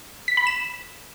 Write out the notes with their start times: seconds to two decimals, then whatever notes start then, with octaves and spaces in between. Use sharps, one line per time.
0.28 B6
0.37 B5
0.47 E7